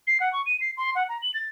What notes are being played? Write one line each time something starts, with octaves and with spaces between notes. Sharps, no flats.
C7
F#5
C#6
D#7
C7
C6
F#5
A#5
F#7
A6